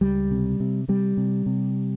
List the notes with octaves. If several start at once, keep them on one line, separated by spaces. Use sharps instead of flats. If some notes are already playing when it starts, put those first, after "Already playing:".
C#2 G3
C3
C3
C3 G3
C3
C3